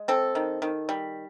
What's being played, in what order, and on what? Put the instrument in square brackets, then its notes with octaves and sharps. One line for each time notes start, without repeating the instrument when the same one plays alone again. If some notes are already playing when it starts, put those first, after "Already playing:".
Already playing: [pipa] G#3
C4 A4
D#3
D#3
G3